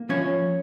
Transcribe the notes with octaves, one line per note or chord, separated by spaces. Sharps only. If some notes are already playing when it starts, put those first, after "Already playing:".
Already playing: A#3
F3 C#4 C#5